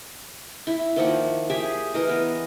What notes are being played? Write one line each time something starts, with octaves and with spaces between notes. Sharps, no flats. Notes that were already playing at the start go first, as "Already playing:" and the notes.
E4
D#3 F3 A#3 F#5
G4 G#4 E5 G#5
E3 A#4 D#5
B3